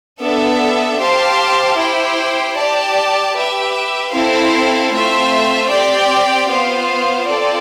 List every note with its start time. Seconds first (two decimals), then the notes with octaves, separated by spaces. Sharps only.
0.21 B3 D4 A4 E5
0.99 G4 C5 F5 A5
1.78 E4 G4 C5 G5
2.57 G4 D5 A5
3.35 G4 B4 E5
4.14 C4 E4 A4 C5 F5
4.92 A3 C4 F4 C5 E5
5.70 C4 G4 D5 G5
6.49 B3 F4 C5 F5
7.27 C4 F4 A4 D5